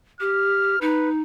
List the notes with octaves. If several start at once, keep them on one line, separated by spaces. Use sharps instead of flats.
G4 F6
D#4 B4